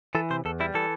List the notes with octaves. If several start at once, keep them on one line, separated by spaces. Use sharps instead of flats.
E3 A4
C3 C5
E2 A4
G3 E4
E3 A4